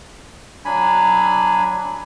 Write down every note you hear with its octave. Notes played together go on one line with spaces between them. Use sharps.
F#3 D4 G#5 B5